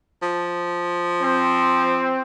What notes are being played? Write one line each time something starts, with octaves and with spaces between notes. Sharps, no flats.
F3
C4